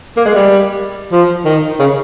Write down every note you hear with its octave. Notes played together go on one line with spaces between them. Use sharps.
A#3
G#3
G3
F3
D#3
C#3